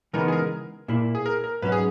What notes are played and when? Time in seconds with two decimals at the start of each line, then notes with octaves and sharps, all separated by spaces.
0.13 C#3 E3 G#3 B3 D#4 A#4
0.28 G#4
0.32 A#4
0.88 A#2 A#3 E4
1.15 G#4
1.26 A#4
1.44 A#4
1.62 G#2 F#3 C#4 B4
1.72 G#4